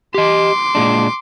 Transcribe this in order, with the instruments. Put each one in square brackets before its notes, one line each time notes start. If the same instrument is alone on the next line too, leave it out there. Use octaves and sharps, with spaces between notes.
[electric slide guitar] G4 D#5 [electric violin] C6 D6
[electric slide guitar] A#2 G#3 D4